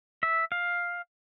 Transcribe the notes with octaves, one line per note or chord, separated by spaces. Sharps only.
E5
F5